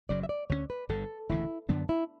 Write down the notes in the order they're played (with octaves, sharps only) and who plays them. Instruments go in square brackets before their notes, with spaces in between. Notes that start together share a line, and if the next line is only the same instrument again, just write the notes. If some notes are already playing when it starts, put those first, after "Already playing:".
[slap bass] F#1 F#2 C#3 F#3 [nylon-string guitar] D5
[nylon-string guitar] E5
D5
[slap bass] D2 D3 F#3 C#4 [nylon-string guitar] C#5
[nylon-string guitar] B4
[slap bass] G1 G2 D3 [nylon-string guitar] A4
[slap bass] E1 D2 C#3 E3 [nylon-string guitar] E4
[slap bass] F#2 D3 F#3 B3 [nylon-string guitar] D4
[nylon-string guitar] E4